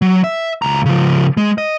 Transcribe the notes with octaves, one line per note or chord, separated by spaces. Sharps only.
F#3
E5
C#2 A#5
C#3 F3
G#3
D#5